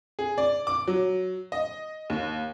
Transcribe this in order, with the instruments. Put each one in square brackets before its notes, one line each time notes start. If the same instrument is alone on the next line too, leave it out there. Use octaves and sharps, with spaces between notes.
[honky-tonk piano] G#4
D5
D6
F#3
D#5
D#2